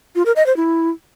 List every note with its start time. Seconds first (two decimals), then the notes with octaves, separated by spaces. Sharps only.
0.15 F4
0.26 A#4
0.36 D#5
0.46 C5
0.57 E4